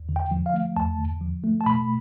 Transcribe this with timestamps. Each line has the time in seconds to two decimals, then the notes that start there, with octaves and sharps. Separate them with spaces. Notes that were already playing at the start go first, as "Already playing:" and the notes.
Already playing: E2
0.09 D3
0.16 G5
0.31 F3
0.46 F5
0.54 A3
0.76 E2 A5
0.99 D3
1.21 F3
1.44 A3
1.61 A5
1.66 B2 B5